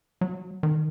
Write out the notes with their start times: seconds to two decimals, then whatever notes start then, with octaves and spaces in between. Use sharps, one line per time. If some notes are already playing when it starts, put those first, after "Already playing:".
0.21 F#3
0.63 D#3